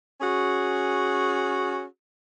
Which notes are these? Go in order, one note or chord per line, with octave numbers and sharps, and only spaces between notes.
C#4 F#4 G#4